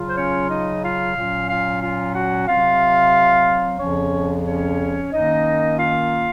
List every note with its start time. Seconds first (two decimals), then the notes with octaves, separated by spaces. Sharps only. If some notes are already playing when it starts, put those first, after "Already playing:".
Already playing: C#3 F#3 F4
0.09 C5
0.16 C#4 C#5
0.49 D#4 D#5
0.83 F4 F5
1.16 A#2 F#3 C#4 F4
1.49 F4 F5
1.82 F4 F5
2.14 F#4 F#5
2.48 C3 F#3 C4 F4 F5
3.79 F2 C#3 F3 C#4 C#5
4.46 C#4 C#5
5.11 F#2 D#3 A#3 D#4 D#5
5.77 F4 F5